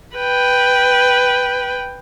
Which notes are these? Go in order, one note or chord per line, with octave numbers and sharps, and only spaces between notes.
B4 G5